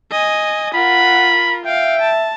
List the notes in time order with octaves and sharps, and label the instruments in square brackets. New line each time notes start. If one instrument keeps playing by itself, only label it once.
[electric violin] D#5 G#5
[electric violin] F4 A#4 [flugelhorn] F#5 [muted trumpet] B5
[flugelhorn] E5 [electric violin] F5 [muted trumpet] G5
[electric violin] A5